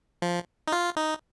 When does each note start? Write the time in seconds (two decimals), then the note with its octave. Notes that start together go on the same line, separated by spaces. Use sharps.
0.22 F3
0.68 D#4
0.72 F4
0.97 D#4